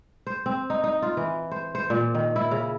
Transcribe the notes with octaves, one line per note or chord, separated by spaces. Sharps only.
C5
C4
D#4
D#4
F4
E3
C5
C5
A#2
D#3
E4
C#3